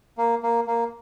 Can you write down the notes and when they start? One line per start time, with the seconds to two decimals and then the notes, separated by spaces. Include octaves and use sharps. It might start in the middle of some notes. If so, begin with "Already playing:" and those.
0.18 A#3
0.43 A#3
0.67 A#3